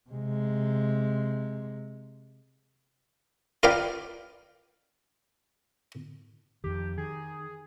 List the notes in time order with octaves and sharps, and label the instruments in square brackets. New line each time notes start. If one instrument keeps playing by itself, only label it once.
[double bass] C3 G#3
[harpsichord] F4 A#4 B4 D5 F5 G5
[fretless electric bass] F2 D#3 [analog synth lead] G4
[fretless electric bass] D#3 [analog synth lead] G#4